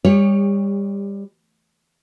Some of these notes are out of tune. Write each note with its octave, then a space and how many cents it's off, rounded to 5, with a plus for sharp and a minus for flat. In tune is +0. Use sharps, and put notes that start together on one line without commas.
G3 +25 G4 +40 C#5 +0